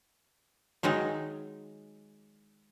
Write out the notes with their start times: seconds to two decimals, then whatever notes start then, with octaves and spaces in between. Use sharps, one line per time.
0.83 D#3 F#3 G#3 D#4